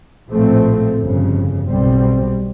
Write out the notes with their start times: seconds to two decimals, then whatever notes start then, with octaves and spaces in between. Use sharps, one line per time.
0.29 A#1 A2 F3 A3 C4
0.98 G1 F2 C#3
1.67 B1 B2 G3 C4